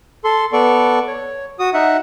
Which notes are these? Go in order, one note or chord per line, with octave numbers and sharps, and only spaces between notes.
A4 C6
B3 A4 D5 C#6
C#5
F#4 D#6
D#4 E5 F#5